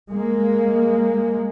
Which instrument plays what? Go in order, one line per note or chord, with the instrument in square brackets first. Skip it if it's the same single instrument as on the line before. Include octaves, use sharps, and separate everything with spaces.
[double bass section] G#3 A#3